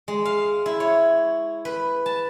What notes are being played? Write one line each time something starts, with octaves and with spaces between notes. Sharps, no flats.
G#3
F5
E4
C#5
B4
A5